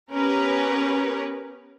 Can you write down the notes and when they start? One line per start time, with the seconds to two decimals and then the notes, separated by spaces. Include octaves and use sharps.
0.13 B3 C#4 G4 A#4 B4